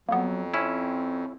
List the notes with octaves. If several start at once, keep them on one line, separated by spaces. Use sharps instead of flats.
F2 F#3 A#3 B3
C4 C#4 E4